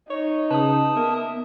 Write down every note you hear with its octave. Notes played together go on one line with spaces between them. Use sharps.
D#4 C#5
C#3 B4 A5 D#6
A#3 B3 E5